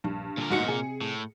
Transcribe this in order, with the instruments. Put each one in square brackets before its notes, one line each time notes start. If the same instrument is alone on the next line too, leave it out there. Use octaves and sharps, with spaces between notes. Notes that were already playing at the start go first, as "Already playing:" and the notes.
[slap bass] A#1 [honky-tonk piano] G2
[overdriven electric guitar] A#2 A#4 [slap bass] D3 G3
[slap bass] G1 D2 D3 [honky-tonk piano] G#2 F#4 C#7
[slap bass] C3 C4 [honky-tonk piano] G#4
[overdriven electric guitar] A2